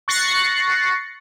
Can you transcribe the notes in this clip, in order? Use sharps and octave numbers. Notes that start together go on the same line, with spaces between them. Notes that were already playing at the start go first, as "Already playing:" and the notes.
C#6 F#6 A6 A#6 C7 C#7